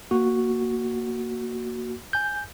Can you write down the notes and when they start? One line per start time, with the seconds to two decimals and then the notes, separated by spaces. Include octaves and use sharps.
0.11 A#3 F#4
2.13 G#5 G6